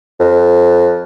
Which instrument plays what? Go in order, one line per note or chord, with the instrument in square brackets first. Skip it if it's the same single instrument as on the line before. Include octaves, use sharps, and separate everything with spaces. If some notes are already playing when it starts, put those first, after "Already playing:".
[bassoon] F2